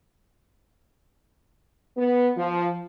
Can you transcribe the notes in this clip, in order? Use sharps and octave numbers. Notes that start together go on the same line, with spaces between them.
B3
F3